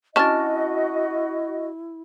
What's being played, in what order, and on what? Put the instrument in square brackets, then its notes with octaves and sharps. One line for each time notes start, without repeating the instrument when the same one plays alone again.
[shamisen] C#4 D4 [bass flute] E4 [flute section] F#4 D#5 [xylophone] A5 F6 A6